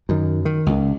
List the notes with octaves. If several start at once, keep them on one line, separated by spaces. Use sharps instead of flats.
F#2 D#3
D#3
C#2